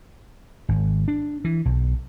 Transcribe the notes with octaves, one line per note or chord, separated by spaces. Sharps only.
G#1
D4
E3
B1